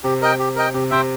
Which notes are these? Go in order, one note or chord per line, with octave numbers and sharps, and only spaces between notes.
C3 G4
A#4 D#5 G5
G4
A#4 D#5 G5
C3 G4
C3 C5 E5 G5